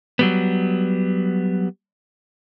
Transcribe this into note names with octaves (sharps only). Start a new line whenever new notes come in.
F#3 G3 B3